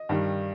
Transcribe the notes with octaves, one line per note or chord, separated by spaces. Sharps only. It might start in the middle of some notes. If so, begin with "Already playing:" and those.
Already playing: D#5
G2 D#3 G3